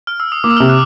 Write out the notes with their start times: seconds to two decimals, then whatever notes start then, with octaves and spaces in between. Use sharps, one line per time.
0.07 F6
0.20 E6
0.32 D#6
0.44 A#3 D6
0.50 E6
0.57 C3 F6
0.69 F#6